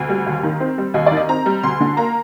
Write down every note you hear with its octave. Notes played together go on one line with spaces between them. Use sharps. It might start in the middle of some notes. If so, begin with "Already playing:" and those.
Already playing: D2
G3
D#2
D#3
C4
G3
D#2 D#5
D#3 D5
D#5
C4 A#5
G3
D2 C6
D3
A#3 A#5